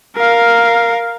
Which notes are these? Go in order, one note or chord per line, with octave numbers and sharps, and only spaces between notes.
A#4 F5